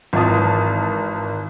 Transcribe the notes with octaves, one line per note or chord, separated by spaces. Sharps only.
G#1 E3 F4 A5 D#6